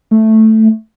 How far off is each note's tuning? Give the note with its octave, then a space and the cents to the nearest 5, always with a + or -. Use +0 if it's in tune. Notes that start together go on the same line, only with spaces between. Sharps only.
A3 +0